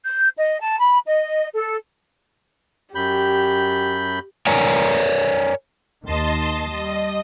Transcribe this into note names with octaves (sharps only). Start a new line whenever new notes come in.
G6
D#5
A5
B5
D#5
A4
F#2 G4 B5 G6
A#4 C#5 D5 G#5 A#5
D#2 D#3 D#5 A5 C6
G3 D#5